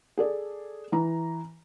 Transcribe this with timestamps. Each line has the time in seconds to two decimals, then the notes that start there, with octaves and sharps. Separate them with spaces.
0.18 G#4 A4 D5
0.92 E3 A#5